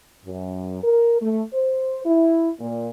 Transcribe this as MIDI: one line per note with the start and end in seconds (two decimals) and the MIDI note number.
0.24 0.82 42
0.82 1.18 70
1.21 1.42 57
1.53 2.00 72
2.05 2.50 64
2.59 2.88 46